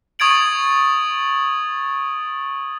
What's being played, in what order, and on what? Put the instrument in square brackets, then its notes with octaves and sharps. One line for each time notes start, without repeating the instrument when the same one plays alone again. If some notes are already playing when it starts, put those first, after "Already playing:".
[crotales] C#6 D#6 G#6 A6 D7 F#7